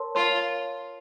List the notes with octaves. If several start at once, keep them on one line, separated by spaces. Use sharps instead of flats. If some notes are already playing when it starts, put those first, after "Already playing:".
Already playing: A#4 C#5 A5 C6
F4 A#4 C#5 A5 C6